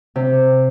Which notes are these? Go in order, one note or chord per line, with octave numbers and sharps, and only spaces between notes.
C3